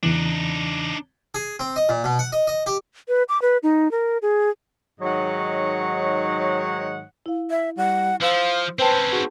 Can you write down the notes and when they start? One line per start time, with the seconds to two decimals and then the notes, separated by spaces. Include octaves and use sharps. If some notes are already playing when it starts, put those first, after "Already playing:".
0.03 E2 C#3 E3 D4 D#4
1.34 G#4
1.59 C4
1.76 D#5
1.89 A#2
2.04 B2
2.19 F#5
2.32 D#5
2.47 D#5
2.66 G4
3.08 B4
3.29 D6
3.42 B4
3.63 D#4
3.91 A#4
4.22 G#4
5.00 G#2 D#3 F#3 C#5 D#5 F#5
7.26 E4 F5
7.50 E5
7.77 G3 F#5
8.22 F3 C5 F5 E6
8.79 C4 C#4 B4 C5 G5 A5
9.12 D#4 F#4 G#4